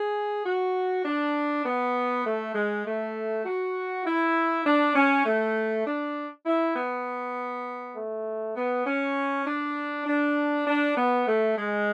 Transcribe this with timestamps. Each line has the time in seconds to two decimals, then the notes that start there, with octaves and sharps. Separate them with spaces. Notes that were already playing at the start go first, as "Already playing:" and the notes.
Already playing: G#4
0.45 F#4
1.05 D4
1.65 B3
2.25 A3
2.55 G#3
2.86 A3
3.45 F#4
4.06 E4
4.66 D4
4.96 C#4
5.26 A3
5.86 D4
6.46 E4
6.76 B3
7.97 A3
8.56 B3
8.87 C#4
9.47 D4
10.07 D4
10.67 D4
10.97 B3
11.27 A3
11.57 G#3